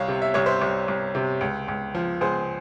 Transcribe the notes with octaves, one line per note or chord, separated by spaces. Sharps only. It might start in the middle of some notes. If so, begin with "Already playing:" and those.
Already playing: C2 C#5 F5
C3
E5
C2 C#5
C5 E5
C2
C2
C3
C#2
C#2
F3
C#2 G#4 C5